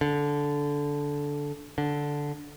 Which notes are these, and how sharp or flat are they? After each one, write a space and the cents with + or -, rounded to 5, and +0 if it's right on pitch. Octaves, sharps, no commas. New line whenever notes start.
D3 -15
D3 -5